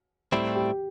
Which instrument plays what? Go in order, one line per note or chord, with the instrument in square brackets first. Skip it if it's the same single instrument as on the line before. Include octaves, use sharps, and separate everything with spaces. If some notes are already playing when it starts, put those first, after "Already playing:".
[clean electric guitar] A2 G3 C4 E4
[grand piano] G4